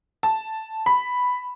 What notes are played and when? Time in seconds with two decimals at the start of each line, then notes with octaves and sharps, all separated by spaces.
0.23 A5
0.86 B5